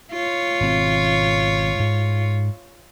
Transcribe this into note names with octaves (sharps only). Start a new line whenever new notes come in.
F4 C#5
G#1 B2 C4
G#2